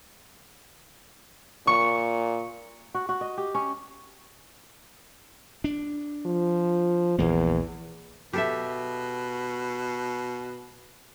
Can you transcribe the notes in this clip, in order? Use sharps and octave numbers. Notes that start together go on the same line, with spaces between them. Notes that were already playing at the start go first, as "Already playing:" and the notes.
A#2 C#6
F#4
F#4
D#5
G4
C#4
D4
F3
A#1 E2 E3 A#3
B2 G4 A4 E5